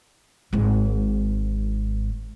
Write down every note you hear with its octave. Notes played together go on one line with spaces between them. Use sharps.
G#1 G#2